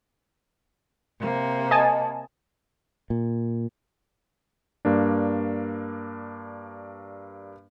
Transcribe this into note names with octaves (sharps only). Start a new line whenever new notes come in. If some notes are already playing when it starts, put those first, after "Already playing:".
C3 A#3
D#5 G#5 A5
A#2
G2 A#3 D4